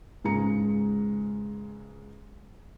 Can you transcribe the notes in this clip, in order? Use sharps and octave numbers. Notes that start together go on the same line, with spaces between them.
C#2 G#2 C#3 G#3 A#5 C#7